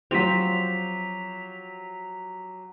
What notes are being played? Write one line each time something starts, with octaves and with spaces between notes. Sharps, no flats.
F3 F#3 C4 G4 B6 F7